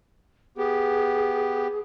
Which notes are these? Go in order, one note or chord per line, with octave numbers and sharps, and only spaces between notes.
B3 G4 G#4